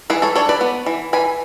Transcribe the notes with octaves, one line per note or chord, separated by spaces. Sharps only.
E3 G#4 B4
A4 C#5
D4 A4 C#5
B4 D5
B3
E3
E3 G#5 B5